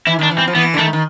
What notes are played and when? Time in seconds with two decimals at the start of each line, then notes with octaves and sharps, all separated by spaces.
0.07 E3 E4
0.19 D#3 D4
0.31 E3
0.38 C4
0.47 F3
0.55 E3 B3
0.74 D3
0.78 D#3 A3
0.93 D#3